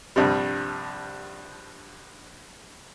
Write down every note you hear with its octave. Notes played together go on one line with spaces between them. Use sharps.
A#1 G2 C3 G3